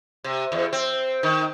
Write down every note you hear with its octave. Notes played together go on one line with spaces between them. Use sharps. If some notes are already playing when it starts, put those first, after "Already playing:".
C3
E2
C4
D#3